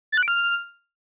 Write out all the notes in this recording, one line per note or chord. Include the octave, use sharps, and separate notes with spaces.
A6
F#6
D7
F6